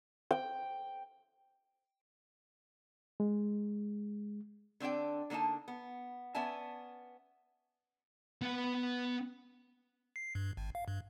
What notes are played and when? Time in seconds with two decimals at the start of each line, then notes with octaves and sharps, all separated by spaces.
0.31 G5
3.20 G#3
4.80 D3 C4 D4 D5 G5
5.30 D3 A#3 C4 D#4 A5
5.68 B3
6.35 B3 C#4 D5 E5 G#5 A5
8.42 B3 F#5
10.16 C7
10.35 G2
10.57 G#1
10.75 F5
10.88 G2